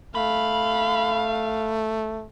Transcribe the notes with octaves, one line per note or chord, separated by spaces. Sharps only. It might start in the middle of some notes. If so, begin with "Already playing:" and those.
A3 F5 B5